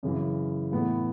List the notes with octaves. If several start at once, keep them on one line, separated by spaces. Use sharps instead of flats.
F#2 C#3 E3
A2 E3 B3 E4